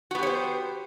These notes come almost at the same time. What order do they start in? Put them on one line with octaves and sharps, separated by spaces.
F#4 B3 G4 C#5 C5